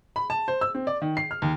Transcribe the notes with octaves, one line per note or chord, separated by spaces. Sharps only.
B5
A5
C5
E6
C4
D5
D#3
C7
F6
D#2